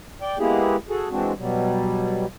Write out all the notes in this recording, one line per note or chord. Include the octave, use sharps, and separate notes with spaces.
D5 G5
G#3 A#3 B3 E4 G4 G#4
F#4 G#4 A4
E3 G#3 C4 D4 F#4
B2 F#3 G3